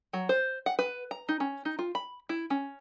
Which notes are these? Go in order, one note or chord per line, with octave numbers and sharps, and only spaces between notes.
F#3
C5
F#5
B4
A#5
D#4
C#4
D#4
F4
B5
E4
C#4